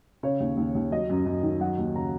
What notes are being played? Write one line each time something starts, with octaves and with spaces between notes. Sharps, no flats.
C#3 C#5
D#2
D#2
D#2
F#3 D#5
F#2
F#2
D#3
F#3 F#5
D#2
C#3 A#5